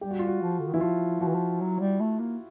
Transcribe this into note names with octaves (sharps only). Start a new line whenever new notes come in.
G3 G4
F#4
F4
F#4
F3
D3
D#3
E3 E4
F3 F4
F3 F#4
E3
F3
F#3
G3
A3
A#3